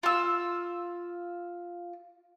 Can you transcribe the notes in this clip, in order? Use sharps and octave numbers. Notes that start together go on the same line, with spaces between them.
F4 E6